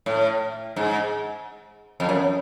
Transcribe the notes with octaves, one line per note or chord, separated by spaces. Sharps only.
A2
G#2
F2
F#2